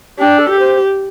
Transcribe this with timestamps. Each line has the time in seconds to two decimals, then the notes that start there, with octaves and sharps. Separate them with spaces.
0.19 D4 G4
0.38 A4
0.49 G4
0.59 C5